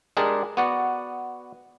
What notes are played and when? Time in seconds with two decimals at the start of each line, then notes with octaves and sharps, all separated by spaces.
0.17 G#3 D4 G4 G#4 A#4 D5
0.57 B3 F#4 D5 F#5